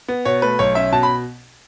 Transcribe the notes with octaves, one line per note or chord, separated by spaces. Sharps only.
B3
B2 C#5
A3 B4
B1 C#5
C#4 E5
B2 A5
B5